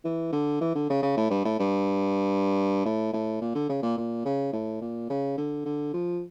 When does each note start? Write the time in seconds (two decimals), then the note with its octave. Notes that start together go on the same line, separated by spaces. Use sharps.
0.05 E3
0.32 D3
0.61 E3
0.75 D3
0.90 C#3
1.03 C#3
1.17 A2
1.31 G2
1.45 A2
1.59 G2
2.85 A2
3.13 A2
3.42 A#2
3.55 D3
3.69 C#3
3.83 A#2
3.97 A#2
4.26 C#3
4.53 A2
4.82 A#2
5.10 C#3
5.38 D3
5.65 D3
5.94 F3